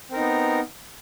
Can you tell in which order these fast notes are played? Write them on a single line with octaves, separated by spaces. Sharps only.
C4 A#4 D#4 B3